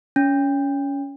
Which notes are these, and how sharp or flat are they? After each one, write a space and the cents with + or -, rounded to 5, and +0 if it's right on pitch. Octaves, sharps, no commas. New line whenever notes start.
C#4 +20